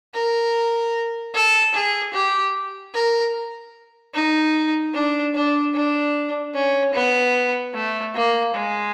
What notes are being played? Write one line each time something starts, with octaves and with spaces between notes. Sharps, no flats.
A#4
A4
G#4
G4
A#4
D#4
D4
D4
D4
C#4
B3
A3
A#3
G#3